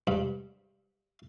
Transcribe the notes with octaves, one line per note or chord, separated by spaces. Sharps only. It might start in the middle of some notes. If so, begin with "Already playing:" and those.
G2